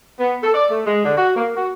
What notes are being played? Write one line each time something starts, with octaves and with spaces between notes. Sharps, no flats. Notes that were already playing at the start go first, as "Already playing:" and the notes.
B3
A4
D5
A3
G#3
D3
F#4
A#3
F#4